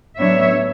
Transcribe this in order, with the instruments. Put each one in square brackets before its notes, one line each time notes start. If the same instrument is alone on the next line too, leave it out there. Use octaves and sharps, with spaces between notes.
[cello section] A2 F#3 B3 D4 C#5 E5